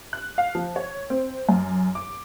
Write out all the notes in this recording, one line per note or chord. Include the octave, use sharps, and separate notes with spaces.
F#6
F5
F3
C#5
C4
F#2
D6